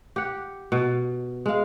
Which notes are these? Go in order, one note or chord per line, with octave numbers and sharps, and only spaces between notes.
G4 F#5
B2
G#3 F5